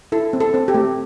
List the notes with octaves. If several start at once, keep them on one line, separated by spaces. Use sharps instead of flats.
E4 A4
C4
A4
C4
G4
A3